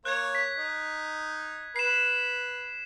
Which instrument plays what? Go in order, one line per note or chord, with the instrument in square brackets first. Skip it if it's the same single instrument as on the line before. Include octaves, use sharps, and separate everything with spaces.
[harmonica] A#3 C#5 [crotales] F#6 G#6
[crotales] B6
[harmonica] D#4
[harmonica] B4 [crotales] C7 E7